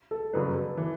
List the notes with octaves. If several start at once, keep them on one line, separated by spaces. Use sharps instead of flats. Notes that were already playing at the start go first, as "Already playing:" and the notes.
A4
G1 F#2 C#3 F#3 B4
B4
E3